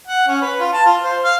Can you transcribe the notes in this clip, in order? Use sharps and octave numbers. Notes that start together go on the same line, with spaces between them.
F#5
C#4
B4
F4
A5
F4
C5
F5